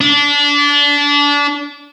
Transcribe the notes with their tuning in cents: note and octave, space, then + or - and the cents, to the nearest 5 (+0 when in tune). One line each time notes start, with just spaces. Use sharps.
D4 -25